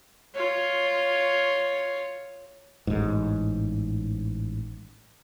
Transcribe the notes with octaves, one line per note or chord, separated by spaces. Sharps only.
F4 C#5
A1 G#2